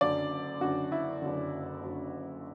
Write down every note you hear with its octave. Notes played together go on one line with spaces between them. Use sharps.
F#1 F#2 D3 D5
F#1 F#2 D3 F#4
E4
F#1 F#2 D3
F#1 F#2 D3